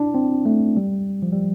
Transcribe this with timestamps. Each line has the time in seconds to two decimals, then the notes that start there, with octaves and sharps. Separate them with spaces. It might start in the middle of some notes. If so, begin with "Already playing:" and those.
Already playing: D4 E4
0.14 C4
0.46 A3
0.77 G3
1.23 F3
1.32 G3